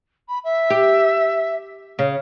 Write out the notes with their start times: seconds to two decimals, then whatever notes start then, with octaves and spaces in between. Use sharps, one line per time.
0.28 B5
0.44 E5
0.70 G4
1.99 C#3